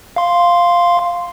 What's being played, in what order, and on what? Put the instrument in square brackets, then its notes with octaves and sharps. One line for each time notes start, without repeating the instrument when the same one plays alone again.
[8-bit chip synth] F5 C6